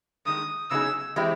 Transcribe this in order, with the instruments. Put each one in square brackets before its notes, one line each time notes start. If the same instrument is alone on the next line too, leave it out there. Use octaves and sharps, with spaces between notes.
[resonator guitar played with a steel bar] G2 D#3 G#3 [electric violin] D#6
[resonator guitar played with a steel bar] C#3 F#3 B3 D#4 G#4 [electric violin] E6
[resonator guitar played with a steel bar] E3 G#3 C4 E4 G4